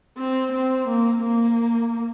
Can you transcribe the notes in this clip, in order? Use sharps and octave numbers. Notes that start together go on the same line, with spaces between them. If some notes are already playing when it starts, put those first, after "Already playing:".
C4
C4
A#3
A#3